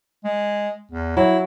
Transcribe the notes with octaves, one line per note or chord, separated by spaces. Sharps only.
G#3
E2
F#3 E4